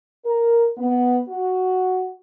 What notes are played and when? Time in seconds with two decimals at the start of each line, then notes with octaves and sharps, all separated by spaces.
0.25 A#4
0.77 B3
1.28 F#4